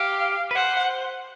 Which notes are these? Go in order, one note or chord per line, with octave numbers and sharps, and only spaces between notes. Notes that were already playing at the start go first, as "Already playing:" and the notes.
Already playing: G4 F5
B4
C5 F#5